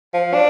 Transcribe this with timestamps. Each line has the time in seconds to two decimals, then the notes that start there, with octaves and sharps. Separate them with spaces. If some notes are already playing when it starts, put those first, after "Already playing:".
0.14 F3
0.34 D4